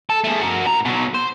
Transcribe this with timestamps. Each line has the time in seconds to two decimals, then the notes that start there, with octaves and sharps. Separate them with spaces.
0.10 A4
0.24 A3 G#4
0.41 F#4 A#4
0.66 A2 A#5
0.85 B2 F#3
1.15 C5